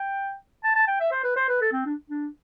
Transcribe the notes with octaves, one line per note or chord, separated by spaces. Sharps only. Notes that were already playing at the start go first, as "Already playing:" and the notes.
Already playing: G5
A5
A5
G5
E5
C5
B4
C5
B4
A4
C4
D4
D4